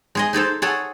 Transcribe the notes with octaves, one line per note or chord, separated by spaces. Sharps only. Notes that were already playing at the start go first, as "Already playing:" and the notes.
G#3 G#4 D#5
D#4 G#4 A4 C5
G#4 A4 C#5 F#5